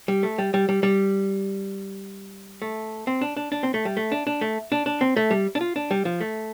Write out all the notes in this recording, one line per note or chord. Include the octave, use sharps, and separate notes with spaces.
G3
A3
G3
G3
G3
G3
A3
C4
D4
D4
D4
C4
A3
G3
A3
D4
D4
A3
D4
D4
C4
A3
G3
D4
F4
D4
G3
F3
A3